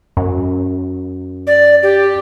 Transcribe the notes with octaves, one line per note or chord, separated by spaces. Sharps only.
F#2
D5
G4